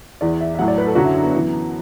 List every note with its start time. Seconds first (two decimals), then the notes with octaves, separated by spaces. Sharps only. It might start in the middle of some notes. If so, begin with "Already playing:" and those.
0.21 E2 E3 D5
0.41 E5
0.55 E5
0.59 A2 F#3 F#5
0.68 D5
0.78 B4
0.87 A4
0.95 F#2 D3 F#3 F#4
1.05 E4
1.15 D4
1.23 B3
1.34 F#2 E3